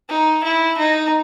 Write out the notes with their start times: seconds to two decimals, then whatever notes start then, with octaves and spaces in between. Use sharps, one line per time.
0.09 D#4
0.44 E4
0.78 D#4